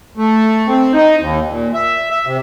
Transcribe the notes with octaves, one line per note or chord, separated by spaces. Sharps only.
A3
C4
D#4
D#2
A#2
E5
E5
C3